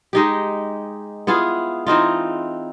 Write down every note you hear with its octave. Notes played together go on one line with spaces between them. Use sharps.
G#3 D#4 G4
B3 E4 F4 G#4
E3 C4 D#4 F4